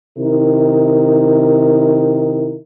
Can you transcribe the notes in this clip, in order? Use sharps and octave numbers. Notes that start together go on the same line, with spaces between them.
C3 D#3 D#4 E4 A#4